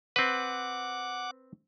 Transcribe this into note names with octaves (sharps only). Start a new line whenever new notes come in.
C4 B4 F#5 D6